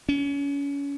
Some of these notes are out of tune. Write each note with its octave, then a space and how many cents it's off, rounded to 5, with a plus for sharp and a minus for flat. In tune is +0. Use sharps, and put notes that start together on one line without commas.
C#4 +30